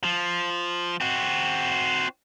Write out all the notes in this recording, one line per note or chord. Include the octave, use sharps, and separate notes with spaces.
F3
C4 F#4